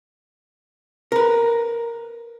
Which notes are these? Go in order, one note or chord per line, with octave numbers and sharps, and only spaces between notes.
A#4 B4